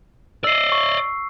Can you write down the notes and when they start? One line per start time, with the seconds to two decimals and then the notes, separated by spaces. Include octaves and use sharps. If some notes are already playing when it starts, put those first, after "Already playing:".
0.44 D5 D#5 E6 C7
0.72 C#6